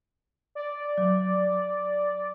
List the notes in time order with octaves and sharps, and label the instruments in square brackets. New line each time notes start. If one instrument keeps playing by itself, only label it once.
[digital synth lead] D5
[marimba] F#3